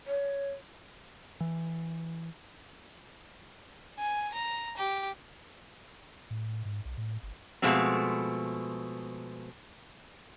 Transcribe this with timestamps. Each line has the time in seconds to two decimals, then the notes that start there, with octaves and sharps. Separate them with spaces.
0.07 C#5
1.41 E3
3.99 G#5
4.34 A#5
4.77 G4
6.30 A2
6.65 G#2
6.85 B1
6.97 A2
7.23 G1
7.62 B2 F3 G#3 A3 C4